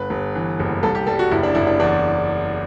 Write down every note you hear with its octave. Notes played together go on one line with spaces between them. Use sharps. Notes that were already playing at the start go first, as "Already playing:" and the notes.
Already playing: G1 B4
G1
E3
F#1
C2 A4
G4
G3 A4
F#4
F#1 E4
D4
F#1 E4
D4
E2 D4